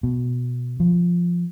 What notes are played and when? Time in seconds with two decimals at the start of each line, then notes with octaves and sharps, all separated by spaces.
0.03 B2
0.80 F3